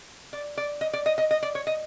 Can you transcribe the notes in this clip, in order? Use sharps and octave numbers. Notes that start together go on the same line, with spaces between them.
D5
D5
D#5
D5
D#5
D#5
D#5
D5
C#5
D#5